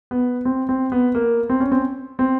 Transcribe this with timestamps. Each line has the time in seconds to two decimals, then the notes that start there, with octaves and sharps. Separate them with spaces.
0.11 B3
0.45 C4
0.69 C4
0.92 B3
1.15 A#3
1.49 C4
1.60 C#4
1.71 C4
2.19 C4